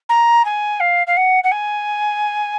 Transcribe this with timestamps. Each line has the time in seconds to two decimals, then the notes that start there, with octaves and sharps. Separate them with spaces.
0.09 A#5
0.45 G#5
0.80 F5
1.07 F5
1.17 F#5
1.44 F#5
1.51 G#5